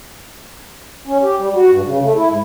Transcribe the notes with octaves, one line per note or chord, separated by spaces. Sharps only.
C#4
G4
G3
F#4
G2
C#3
A3
E4
G#2